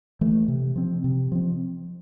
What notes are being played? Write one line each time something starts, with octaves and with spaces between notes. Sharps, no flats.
E3 A3
C3
F3 C4
C3
F3 C4